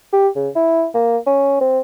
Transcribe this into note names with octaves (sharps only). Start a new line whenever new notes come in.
G4
C#3
E4
A#3
C#4
C4